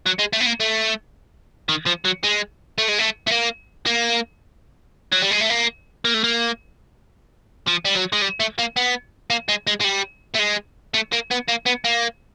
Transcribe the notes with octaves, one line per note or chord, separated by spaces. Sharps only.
F#3
G#3
A3
B3
A#3
A3
D#3
F3
F#3
G#3
A3
G#3
A3
A3
A#3
A#3
F#3
G3
G#3
A3
A#3
A#3
A3
A#3
F3
G3
F#3
G#3
G3
A3
A#3
B3
A#3
G#3
G#3
G#3
G3
A3
G#3
A3
A#3
B3
A#3
B3
A#3